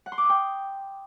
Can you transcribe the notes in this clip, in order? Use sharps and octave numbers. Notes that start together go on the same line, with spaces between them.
F#5
C6
D6
D#6
G5